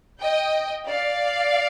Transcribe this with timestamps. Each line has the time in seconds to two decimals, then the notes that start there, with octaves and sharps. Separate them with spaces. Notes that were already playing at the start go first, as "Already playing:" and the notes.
0.21 D#5 G5
0.89 D5 F5